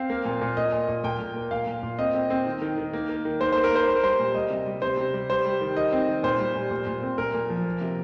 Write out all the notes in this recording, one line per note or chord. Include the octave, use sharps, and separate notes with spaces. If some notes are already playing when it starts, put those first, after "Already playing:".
Already playing: C4 F5
A#3
A#2
A#2
A#2 D#5
A#2
A#2
A#2 G5
A#2
A#3
A#2 F5
A#2
A#2
C4 D#5
C4
C4
D#3
D#3
D#3
A#3
A#3
D#3
A#3 C5
A#3 C5
A#4
A#3 C5
A#3 C5
A#4
G3 C5
A#2
G3 D#5
C3
G3
C3 C5
C3
G3
G3 C5
G3
D#3
D#3 D#5
C4
D#3
A#2 C5
G3
A#2
A#2
A#2
C4
A#2 A#4
A#2
F3
A#3
C3